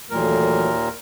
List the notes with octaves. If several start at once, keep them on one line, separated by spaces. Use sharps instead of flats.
D#2 A#2 E3 F#3 A3 A#4